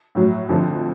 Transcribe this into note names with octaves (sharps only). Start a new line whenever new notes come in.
A2 F#3
F2 D3 F3